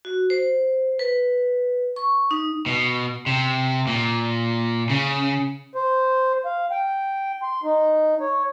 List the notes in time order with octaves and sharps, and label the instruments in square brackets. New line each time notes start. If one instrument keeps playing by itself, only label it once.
[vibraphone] F#4
C5
B4
C#6
D#4
[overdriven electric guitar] B2
C3
A#2
C#3
[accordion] C5
F5
G5
C6
D#4
C#5